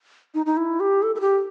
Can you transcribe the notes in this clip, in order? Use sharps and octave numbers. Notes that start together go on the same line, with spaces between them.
D#4
D#4
E4
G4
A4
A4
G4